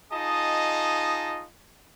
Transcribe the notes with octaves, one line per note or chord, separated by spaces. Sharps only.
D#4 F4 G#4 D#5 A5 D#6